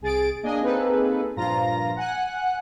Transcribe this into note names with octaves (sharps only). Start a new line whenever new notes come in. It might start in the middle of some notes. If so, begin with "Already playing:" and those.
C2 G#4 A6 D7
A#3 D4 G#4 D#5 G#5
A#3 C4 D#4 G#4 A4 B4
G2 A#2 F3 F4 A#5 A#6
F#5 G#5 F#6